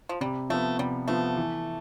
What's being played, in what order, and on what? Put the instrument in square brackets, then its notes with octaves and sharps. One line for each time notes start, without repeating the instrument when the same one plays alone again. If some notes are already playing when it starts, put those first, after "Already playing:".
[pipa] F3
[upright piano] C3 [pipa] G3
[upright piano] F3 B3 [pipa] A3
[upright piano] C3 [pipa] G3
[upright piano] F3 B3 [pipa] A3
[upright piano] E3